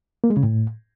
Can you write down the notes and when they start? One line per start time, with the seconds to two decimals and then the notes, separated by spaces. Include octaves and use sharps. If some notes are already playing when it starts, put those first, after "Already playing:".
0.24 A#3
0.30 G#3
0.37 C#3
0.43 A2